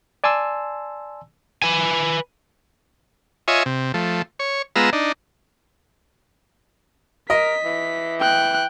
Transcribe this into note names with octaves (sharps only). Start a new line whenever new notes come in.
D5 G#5 A5 C6 E6
B4 G#5
F4 C#5 D#5 E5 G#5
C3
F3 A3
C#5
G#3 B3 F4 A#5 E6
D4 D#4
A#4 D#5 B6
E3
G5 F#6